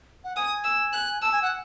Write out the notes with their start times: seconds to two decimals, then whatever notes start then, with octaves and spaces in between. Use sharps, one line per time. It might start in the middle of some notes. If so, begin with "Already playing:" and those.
0.24 F#5
0.36 G#5 D#6
0.64 E6
0.93 F#6
1.21 A5 E6
1.32 G#5
1.42 F#5